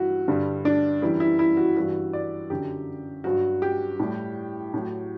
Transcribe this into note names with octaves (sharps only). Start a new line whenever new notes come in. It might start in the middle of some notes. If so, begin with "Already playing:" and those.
Already playing: G2 E3 G3 E4 F#4
G2 D3 G3
D4
F#2 E3 G3 E4
E4
E4
F#4
G2 E3 G3 F#4
D5
F#2 D3 F#3 G4
G2 F#3 F#4
G4
A2 G3
A2 F#3